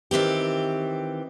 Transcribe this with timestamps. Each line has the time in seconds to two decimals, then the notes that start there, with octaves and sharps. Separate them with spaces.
0.11 D#3 E3 C4 G4